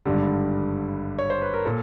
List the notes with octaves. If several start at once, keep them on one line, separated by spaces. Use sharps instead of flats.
G#1 G2 D3 G3
C#5
C5
B4
A#4
A#2 A4